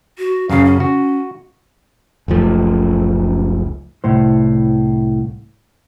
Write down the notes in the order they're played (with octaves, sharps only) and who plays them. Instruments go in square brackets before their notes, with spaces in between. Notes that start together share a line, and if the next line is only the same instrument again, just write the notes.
[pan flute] F#4
[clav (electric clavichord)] F#2 C#3 [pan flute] F5
[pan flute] C#4
[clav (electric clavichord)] F#4
[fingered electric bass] F#1 C#2 F3 A3
[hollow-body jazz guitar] C2 A2 C5